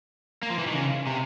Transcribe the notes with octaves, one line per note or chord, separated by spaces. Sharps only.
A#3
F3
E3
D#3
C#3
C3